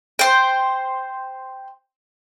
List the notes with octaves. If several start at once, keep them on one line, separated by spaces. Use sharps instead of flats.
C5 G5